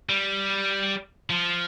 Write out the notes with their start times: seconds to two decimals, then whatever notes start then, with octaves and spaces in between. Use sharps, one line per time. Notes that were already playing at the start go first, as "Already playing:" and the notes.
0.09 G3
1.30 F3